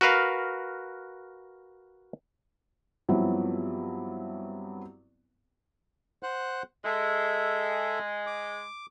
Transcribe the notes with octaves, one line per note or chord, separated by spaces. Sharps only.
F#4 A#4 B4 F5
G2 F3 F#3 B3 C4 E4
C5 F#5 F#6
G#3 A4 E5
D6